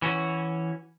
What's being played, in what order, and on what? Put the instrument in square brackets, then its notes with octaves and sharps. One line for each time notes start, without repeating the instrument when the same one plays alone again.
[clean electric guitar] E3 C#4 F#4